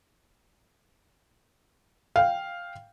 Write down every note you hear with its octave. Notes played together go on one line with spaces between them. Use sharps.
F5 G5